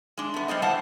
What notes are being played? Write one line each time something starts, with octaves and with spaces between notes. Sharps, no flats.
G#3 D4
A3 B3
G3 B3 C5 D#5
G2 E3 C5 F#5 A5